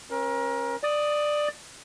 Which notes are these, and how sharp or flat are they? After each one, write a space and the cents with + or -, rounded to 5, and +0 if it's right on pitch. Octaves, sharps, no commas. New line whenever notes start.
C#4 -40 A#4 +30
D5 +15 D#6 +0